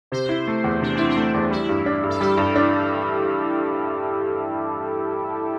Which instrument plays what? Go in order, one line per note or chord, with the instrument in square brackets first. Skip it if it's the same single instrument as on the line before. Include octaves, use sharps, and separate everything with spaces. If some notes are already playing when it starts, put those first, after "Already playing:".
[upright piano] C3 [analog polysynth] C5
[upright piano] E4
A3
E2
[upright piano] C3 [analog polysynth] D4
[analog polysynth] C4 [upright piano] E4
[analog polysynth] D4
[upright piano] A3
E2
[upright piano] G3 [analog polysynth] E4
[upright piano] G2
D4
G2
[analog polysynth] A4
[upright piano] G3 [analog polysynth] G4
[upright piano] G2
D4